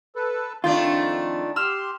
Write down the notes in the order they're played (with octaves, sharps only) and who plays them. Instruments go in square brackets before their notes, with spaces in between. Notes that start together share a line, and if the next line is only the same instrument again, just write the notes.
[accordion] A4 B4
[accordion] F2 [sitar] D#3 A3 D4 [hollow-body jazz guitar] F4
[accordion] G4 C6 [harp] E6 F6